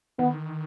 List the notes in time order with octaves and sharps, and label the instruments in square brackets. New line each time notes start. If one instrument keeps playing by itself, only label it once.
[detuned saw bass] D#3 [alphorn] B3